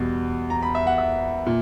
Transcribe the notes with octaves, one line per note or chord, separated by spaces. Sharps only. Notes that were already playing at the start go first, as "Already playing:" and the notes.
Already playing: E2 B2 G3
A#5
B5
E5
F#5
E5
A#2